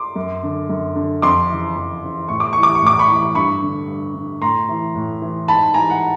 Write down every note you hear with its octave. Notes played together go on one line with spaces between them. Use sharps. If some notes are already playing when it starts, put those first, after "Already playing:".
Already playing: C6 D6
F#2
D3
F#2
D3
F2 C6 D6
C#3 E3
F2
C#3 E3
A2 C#6
D6
E3 C#6
D6
C#6
A2 D6
B5 C#6
E3
G2 B5 C#6
D3
G2
D3
A2 A#5 C6
E3
A2
E3
G#2 A5 B5
E3 G#5 A#5
F#5